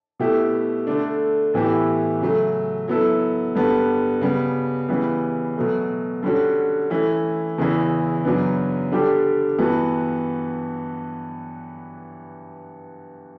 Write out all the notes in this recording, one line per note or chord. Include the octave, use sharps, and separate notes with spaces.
B2 A3 E4 G4
D3 A3 D4
A2 E3 B3 E4 G4
C#3 F#3 A3
F#3 B3 E4 A4
G2 D3 G3 B3
C#3 G3 B3
C#3 E3 G3 B3
B2 F#3 A3
D3 G3 C#4 F#4
E3 A3 C#4
E2 C#3 E3
F#2 C#3 F#3 B3 D4
D3 G3 D4 G4
G2 E3 B3 F#4